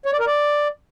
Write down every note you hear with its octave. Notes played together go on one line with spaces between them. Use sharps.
C#5
D5
A#4
D5